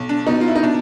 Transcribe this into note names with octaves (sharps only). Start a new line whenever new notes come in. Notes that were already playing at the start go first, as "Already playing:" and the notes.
Already playing: B1
D4
B2 D#4
F4
E4
D#4
B2 D4